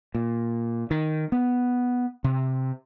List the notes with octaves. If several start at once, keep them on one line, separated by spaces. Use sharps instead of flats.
A#2
D#3
B3
C3